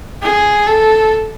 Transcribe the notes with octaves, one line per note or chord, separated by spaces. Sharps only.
G#4
A4